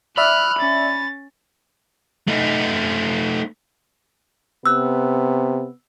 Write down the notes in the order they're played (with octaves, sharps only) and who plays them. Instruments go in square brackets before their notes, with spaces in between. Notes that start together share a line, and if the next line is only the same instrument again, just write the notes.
[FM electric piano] D5 E5 [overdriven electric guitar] B5 [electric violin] F6 F#6
[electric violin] C#4 A6
[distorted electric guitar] A3 D#4
[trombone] C3 [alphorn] B3 [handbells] E6 F#6